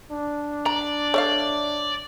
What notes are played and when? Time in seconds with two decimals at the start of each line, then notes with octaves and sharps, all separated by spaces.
0.11 D4
0.66 D5 A#5
1.14 A4 C#5 E5 F5